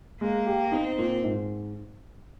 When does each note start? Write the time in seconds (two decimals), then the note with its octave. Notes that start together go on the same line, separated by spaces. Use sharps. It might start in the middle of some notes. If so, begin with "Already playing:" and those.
0.21 G#3 A#3
0.46 G4
0.72 C4 D#4
0.98 A#2
1.24 G#2